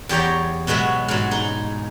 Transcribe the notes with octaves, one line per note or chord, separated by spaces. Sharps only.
E2 G4 C#5 G5 A#5
B2 F#3 G#3 F#4 E5
G#2 F#3
D#4 G#4